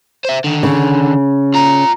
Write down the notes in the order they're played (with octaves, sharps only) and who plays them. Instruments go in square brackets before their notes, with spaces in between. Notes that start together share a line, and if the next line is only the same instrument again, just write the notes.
[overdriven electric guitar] C5 E5
D3 D#3
[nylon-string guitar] C#3
[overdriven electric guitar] F4 A#5